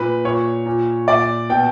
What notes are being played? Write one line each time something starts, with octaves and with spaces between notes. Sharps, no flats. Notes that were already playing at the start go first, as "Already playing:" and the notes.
Already playing: A#2 B4
A#2 C#5
A#2
A#2 D5
B2 G5